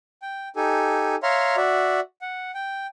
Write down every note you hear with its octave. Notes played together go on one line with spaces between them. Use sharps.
G5
D#4 G4 A4 G#5
C#5 E5 F5 A#5 C6
F#4 D5 E5
F#5
G5